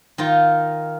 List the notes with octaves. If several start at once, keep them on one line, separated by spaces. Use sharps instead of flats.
D#3 D#4 F4